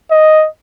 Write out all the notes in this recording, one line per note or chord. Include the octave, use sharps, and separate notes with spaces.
D#5